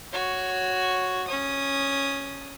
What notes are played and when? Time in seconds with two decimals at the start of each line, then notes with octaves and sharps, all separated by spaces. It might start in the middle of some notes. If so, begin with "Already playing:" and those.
0.13 F#4 C#5
1.28 C#4 D#6